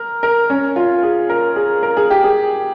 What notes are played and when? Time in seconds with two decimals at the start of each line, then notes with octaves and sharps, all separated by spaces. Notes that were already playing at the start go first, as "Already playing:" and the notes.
Already playing: A#4
0.23 A#4
0.50 C#4
0.76 F4
1.03 G#4
1.29 A#4
1.56 G#4
1.83 A#4
1.97 G#4
2.10 G4
2.24 G#4